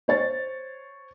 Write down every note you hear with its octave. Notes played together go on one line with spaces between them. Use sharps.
C5 C#5 A6